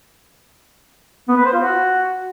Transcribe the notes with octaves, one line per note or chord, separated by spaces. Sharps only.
B3
B4
C5
F4
F#4